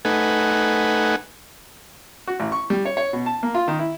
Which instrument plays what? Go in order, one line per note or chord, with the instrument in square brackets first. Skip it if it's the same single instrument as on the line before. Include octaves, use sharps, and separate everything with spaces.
[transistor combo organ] A3 D#4 B4 F#5 G#5
[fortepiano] F#4
A1
C#6
G3
C#5
C#5
B2
A5
A#3
F4
D#3
E4